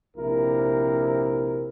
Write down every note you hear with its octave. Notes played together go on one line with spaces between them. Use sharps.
A#1 C3 E4 A#4